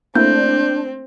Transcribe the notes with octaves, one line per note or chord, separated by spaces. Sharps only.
A3 A#3 C4 D4 E4 G6